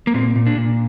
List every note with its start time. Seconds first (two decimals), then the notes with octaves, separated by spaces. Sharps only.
0.07 A#3
0.14 A#2 C4
0.36 A#2
0.47 D4
0.57 A#2